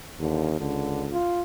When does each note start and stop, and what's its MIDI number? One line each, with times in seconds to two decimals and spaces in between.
0.19 0.57 39
0.19 0.50 50
0.60 1.17 37
0.60 1.07 50
1.12 1.43 65